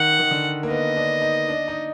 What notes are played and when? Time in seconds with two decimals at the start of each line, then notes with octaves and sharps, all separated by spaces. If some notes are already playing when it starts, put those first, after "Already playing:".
Already playing: D#3 F#5
0.19 D#3
0.31 D3
0.63 A#3
0.70 B3 D#5
0.96 D4
1.22 D#4
1.49 D4
1.68 D#4